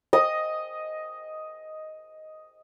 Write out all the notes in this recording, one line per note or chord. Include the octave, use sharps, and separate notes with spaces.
D#5 D#6